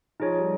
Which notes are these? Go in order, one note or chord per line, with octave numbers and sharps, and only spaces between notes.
F3 D#4 G#4 C#5
G3